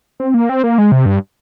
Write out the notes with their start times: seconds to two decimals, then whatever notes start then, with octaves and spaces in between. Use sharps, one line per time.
0.20 C4
0.34 A#3
0.49 C4
0.64 A#3
0.78 G#3
0.92 C3
1.06 G2